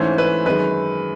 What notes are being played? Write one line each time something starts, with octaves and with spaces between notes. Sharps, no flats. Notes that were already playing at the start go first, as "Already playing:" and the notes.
Already playing: G#2 E3 A3 C#4 C5
B4
F#2 D#3 G#3 B4